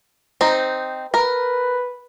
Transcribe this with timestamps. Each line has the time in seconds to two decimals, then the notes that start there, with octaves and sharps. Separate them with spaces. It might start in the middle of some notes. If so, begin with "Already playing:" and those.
0.41 C4 D#4
1.14 A#4 B4